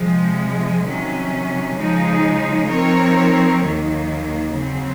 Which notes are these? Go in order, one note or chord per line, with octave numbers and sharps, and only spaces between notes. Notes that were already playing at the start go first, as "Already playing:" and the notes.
Already playing: C3 F3 G#3
C3 D#3 F#3 C#4
C#3 F3 G#3 D#4 G#4
F3 C4 D#4 A#4 C#5
D#2 D#3 F#3 A#3
C#3 F#3 C4